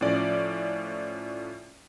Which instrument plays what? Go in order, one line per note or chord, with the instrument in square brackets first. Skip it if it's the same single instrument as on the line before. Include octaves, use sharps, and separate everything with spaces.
[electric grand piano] A2 F3 C#4 D5